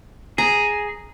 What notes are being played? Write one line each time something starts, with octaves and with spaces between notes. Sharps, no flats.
G#4 A#5